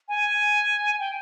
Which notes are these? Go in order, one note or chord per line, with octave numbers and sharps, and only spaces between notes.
G#5
G5